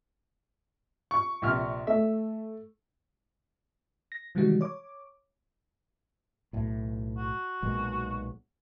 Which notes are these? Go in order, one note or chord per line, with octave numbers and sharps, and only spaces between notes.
C#6
A#1 C3 F6
A3 E5
A#6
C3 D#3 E3 G3 G#3 F#4
C#5 D6
B1 A2
F#4
B1 A#2 G#3